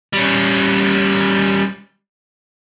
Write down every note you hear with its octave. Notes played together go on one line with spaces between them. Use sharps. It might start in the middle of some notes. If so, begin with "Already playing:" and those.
G3 C#4